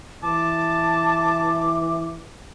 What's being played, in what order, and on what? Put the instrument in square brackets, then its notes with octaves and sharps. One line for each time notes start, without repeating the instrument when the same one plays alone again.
[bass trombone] E3 [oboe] A5 [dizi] D6